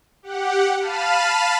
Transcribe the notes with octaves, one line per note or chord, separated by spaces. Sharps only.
G4 F#5
F5 A5 B5 F6 D#7